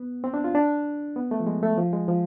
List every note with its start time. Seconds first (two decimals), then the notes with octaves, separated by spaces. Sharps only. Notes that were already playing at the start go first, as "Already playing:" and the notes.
Already playing: B3
0.24 C4
0.34 D4
0.44 F4
0.55 D4
1.16 B3
1.31 A3
1.40 F3
1.47 G#3
1.63 A3
1.77 F3
1.93 G#3
2.08 F3